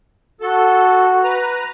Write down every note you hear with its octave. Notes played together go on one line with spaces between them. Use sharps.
F#4 A4
B4 A#5